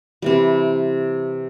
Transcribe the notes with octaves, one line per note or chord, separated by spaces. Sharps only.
C3 E3 G3